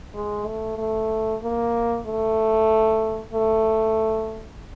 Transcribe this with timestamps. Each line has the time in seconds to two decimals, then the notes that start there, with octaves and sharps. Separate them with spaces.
0.15 G#3
0.47 A3
0.78 A3
1.43 A#3
2.07 A3
3.33 A3